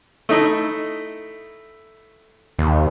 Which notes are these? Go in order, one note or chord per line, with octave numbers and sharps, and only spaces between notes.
A3 D#4 E4
D#2